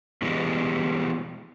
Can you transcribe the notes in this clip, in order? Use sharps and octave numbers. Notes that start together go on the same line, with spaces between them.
B2 E3 G3 G#3